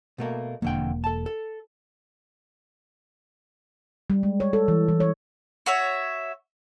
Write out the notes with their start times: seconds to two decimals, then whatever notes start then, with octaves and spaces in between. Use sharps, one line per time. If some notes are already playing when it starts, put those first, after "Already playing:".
0.18 B2 A3 A#3
0.62 E1 F2 D3 A#3 G5
1.04 A4 A5
1.26 A4
4.10 G3
4.23 G#3
4.40 C#5
4.53 A4
4.68 E3
4.88 E3
5.00 C#5
5.66 F#4 C#5 E5